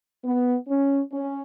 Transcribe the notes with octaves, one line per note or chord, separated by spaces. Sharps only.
B3
C#4
C#4